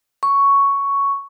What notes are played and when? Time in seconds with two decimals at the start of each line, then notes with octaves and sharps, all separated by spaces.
0.23 C#6